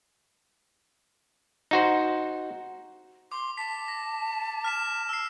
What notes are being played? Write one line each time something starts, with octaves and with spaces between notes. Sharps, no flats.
D#4 F#4 C5
C6 D6
A5 B6
A#6
F6 B6 E7
E6 C7